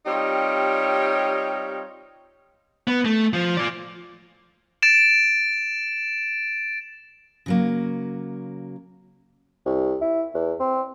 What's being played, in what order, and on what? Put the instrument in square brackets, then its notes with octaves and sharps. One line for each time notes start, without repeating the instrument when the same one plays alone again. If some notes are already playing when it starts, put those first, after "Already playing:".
[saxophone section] G3 C4 D#4 F4 G4 C#5
[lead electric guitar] B3
A3
F3
F4 D5
[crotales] A6 D7 E7
[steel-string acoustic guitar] C#3 F#3 A#3
[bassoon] C2
E4
E2
C4